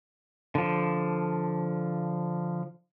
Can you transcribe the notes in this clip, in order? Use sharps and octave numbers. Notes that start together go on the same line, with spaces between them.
D3 F3